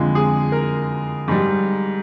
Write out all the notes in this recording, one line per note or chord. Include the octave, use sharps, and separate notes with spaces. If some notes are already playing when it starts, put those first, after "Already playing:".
Already playing: F2 D3 G#3 F4
G#4
A#4
G#2 G3